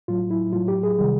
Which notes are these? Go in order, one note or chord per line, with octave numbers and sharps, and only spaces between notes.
A2 F#3 F4
E4
A2 F#3 F4
G4
G#4
C3 D#3 G3